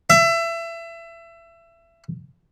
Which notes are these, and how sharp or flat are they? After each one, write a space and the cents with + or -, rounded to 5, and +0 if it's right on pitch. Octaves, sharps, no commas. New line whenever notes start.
E5 +25